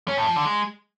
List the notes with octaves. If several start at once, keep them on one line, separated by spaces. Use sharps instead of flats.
C#4
A2
F3
D3
G#3